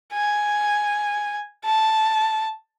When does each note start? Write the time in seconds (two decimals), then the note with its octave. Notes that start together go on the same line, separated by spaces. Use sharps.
0.13 G#5
1.65 A5